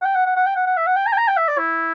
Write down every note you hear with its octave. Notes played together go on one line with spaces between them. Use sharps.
F#5
G5
F#5
F#5
F#5
G5
F#5
F#5
E5
F#5
G5
A#5
G5
A#5
G5
E5
D5
E4